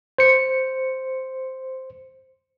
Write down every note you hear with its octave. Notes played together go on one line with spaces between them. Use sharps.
C5 C#7